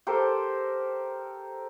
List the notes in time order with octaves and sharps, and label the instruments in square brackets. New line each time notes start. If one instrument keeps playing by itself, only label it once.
[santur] G4 A4 A#4 C5